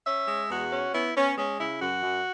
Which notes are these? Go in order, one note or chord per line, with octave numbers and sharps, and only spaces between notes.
C#4 E5
G#3
E2 F#4
C#4
B3 E4
B3 C#4
G#3 C#4
C#3 E4
F#2 F#4
F#2